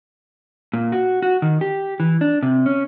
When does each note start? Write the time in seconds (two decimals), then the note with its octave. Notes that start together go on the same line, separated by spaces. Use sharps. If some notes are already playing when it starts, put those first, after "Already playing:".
0.73 A#2
0.92 F#4
1.22 F#4
1.42 D#3
1.61 G4
2.00 E3
2.21 D4
2.43 C3
2.66 C#4